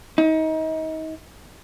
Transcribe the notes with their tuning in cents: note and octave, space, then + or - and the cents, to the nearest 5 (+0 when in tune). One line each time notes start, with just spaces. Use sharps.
D#4 +30